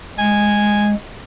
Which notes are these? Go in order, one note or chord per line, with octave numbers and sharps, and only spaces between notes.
G#3 G#5